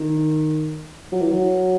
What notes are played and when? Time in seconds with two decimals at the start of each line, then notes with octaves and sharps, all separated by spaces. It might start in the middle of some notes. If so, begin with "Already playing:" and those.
Already playing: D#3
1.12 F#3
1.22 E3
1.31 F#3